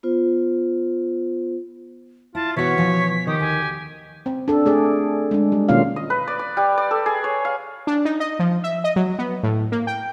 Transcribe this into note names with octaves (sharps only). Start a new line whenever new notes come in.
B3 F4 C5
E4 F4 A5
B2 E3 B3 F#4 C#5 B6
B2 F3 G#5
D#3 G4 D#6
D2 G#5
C4
D4 A4
A3 G#4 D5
G#3 D4
G3
B2 D#3 A#3 C#4 F4 F5
D#5
B4
D5
D5
G3
D5
A4
G#4
C#5
F5
D4
D#4
D#5
F3
E5
D#5
F#3
B3
A2
A#3
G5